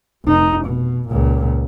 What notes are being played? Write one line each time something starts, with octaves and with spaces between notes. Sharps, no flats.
F1 D#4
B2
C#2 A#2